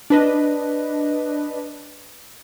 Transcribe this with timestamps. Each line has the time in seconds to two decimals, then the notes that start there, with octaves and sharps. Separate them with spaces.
0.10 D4 B4 D#5